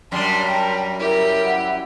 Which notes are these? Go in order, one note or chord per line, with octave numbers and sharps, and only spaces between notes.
F#2 G3 D4 A5 C6
A#4 G5
E4 G4 A#4
F#5